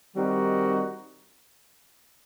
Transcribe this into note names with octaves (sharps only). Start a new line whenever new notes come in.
D#3 G3 C4 D#4 F#4